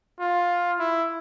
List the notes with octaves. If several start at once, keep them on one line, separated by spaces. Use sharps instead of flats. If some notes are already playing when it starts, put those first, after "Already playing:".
F4
E4